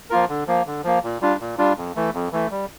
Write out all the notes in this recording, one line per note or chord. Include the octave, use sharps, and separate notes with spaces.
F3 A#3 F4 A#4
D3
F3 A#3
D3
F3 A#3
A#2
G3 D4 F4
A#2
G3 D4 F4
F2
E3 A3
F2
E3 A3
G3